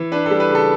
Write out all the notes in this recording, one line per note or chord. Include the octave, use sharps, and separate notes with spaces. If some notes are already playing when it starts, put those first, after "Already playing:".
Already playing: E3
D4 B4
G3 A4
B4
C#3
A4